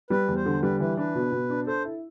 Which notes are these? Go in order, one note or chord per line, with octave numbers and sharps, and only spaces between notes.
G3 B4
E2
C5
D3
G3 B4
E3 B4
D4 B4
B2
B2
D4
A4 C5
E4